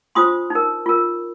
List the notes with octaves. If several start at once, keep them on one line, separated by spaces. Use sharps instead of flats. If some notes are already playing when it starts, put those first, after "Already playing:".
D4 F4 C5 C6 D#6
D#4 A#4
F4 A#4